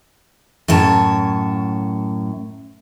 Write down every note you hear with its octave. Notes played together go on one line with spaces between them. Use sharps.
F#2 A2 C#5 A5